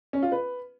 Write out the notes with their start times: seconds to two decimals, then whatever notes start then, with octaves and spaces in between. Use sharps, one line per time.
0.13 C#4
0.23 F4
0.32 B4